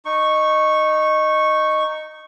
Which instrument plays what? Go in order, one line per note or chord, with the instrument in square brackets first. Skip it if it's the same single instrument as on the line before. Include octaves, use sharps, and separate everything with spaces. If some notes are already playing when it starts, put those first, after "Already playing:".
[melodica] D#4 C#6